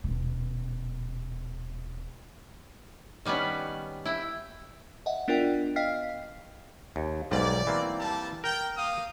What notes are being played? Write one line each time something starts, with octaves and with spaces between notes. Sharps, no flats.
D#1 B2
D#3 G3 B3 C#4 B4
E4 G5
D#5 E5 F#5
B3 D4 F4 A#4 D5 G5
D#5 F5 G5 F6 B6 C7
D#2
B1 G#2 G3 D5
E3 A#3 C4
G3 A5
A#4 G5
A#3 F5 D#6